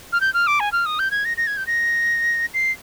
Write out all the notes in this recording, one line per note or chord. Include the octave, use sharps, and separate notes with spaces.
F6
G6
F6
D6
G#5
F6
D#6
G6
G#6
A#6
A#6
G#6
G6
A#6
C7